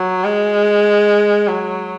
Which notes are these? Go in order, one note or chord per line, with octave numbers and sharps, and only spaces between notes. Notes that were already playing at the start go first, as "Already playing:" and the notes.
Already playing: F#3
G#3
F#3